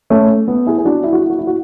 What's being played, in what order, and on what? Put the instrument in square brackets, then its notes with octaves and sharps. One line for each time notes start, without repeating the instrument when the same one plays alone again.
[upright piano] A3 C#4
B3
E4 G#4
G#4
D4 F#4
E4
F#4
E4
F#4
E4
F#4